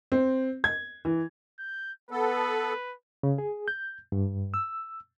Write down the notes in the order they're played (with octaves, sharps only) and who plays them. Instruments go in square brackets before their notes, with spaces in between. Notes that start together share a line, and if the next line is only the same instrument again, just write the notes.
[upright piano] C4
G#6
E3
[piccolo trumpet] G6
[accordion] B3 A4 [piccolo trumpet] B4
[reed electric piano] C#3
G#4
G6
G2
E6